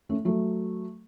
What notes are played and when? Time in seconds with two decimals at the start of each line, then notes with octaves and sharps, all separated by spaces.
0.09 A3 C#4
0.25 F#3 A3